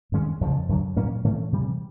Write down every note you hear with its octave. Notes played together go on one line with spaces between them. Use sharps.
G2 D#3 G#3 C#4
F2 C#3 F3
F#2 D3 F#3
A#2 F#3 A#3 C#4
A2 E3 A3 C#4
C3 E3 G3